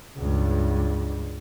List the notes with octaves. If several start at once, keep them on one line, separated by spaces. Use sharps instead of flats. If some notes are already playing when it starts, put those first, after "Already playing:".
C#2 G2